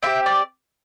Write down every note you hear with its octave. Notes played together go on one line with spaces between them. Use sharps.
C4 E4 G4 E5
D5